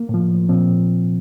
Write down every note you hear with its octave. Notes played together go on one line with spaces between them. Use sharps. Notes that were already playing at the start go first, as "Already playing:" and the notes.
Already playing: A#3
A2 F3
A#2 F3 C4